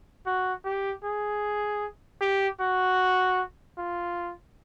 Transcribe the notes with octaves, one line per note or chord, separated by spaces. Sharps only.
F#4
G4
G#4
G4
F#4
F4